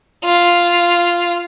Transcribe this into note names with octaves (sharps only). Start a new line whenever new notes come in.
F4